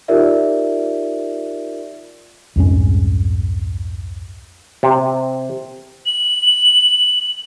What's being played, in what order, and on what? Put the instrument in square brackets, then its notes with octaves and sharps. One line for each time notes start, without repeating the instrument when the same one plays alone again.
[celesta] D#4 F4 G4 A#4 D5 E5
[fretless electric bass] C2 F2 G#2 C#4
[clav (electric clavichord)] C3
[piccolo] F#7